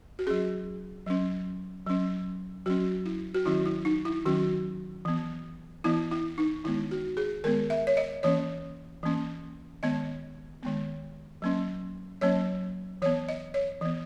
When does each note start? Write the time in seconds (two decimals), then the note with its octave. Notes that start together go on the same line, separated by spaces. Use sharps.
0.19 F#4
0.26 F#3 C#4 G#4
1.06 F#3 C#4
1.86 F#3 C#4
2.66 F#3 C#4 F#4
3.06 E4
3.34 F#4
3.45 D#3 F#3 C#4 E4
3.66 E4
3.85 D#4
4.05 E4
4.26 D#3 F#3 C#4 F#4
5.05 E3 B3
5.84 E3 B3 E4
6.12 E4
6.38 D#4
6.64 D#3 G#3 B3 E4
6.91 F#4
7.17 G#4
7.44 D#3 G#3 B3 A#4
7.70 E5
7.87 C#5
7.97 D#5
8.23 E3 A#3 C#4 C#5
9.03 E3 A#3 C#4
9.83 D#3 G#3 B3 D#5
10.63 D#3 G#3 B3
11.42 F#3 A#3 C#4
12.21 F#3 A#3 C#4 C#5
13.02 E3 B3 C#5
13.28 D#5
13.54 C#5
13.81 E3 B3